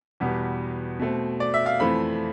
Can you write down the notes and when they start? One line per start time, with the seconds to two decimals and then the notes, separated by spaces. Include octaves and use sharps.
0.20 E2 B2 G3 B3
0.99 B2 A3 C4
1.40 D5
1.54 E5
1.66 F5
1.79 F2 E3 A3 C4 B5